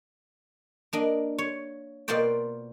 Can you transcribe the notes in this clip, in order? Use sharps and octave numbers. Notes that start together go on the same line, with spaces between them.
A#3 D4 D#5
C#5
B2 A#3 F4 C5 D5 G5